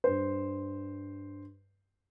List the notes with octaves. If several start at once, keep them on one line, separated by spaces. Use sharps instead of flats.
G2 C5